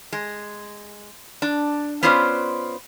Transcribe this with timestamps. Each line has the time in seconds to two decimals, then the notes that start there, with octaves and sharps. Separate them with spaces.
0.13 G#3
1.42 D4
2.03 B3 C#4 F4 B4 C5 D5